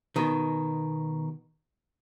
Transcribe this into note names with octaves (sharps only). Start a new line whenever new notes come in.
B2 D#3